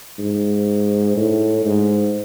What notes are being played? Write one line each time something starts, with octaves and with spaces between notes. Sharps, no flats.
G#2
A2
G#2